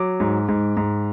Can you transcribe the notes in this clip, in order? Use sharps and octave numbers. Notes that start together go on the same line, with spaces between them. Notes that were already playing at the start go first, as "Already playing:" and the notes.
Already playing: F#3 D6
G#2
G#2
G#2